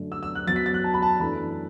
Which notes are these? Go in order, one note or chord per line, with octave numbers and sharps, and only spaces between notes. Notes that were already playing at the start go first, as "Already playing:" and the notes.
Already playing: F#2 D3 A3 D4
E6
E6
F#6
F#2 F#3 B3 A6
B6
A6
F#6
A5
B5
A5
F#2 E3 A3 D4 B5